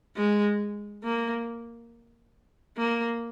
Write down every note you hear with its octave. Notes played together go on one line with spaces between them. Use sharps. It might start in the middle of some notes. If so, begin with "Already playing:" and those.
G#3
A#3
A#3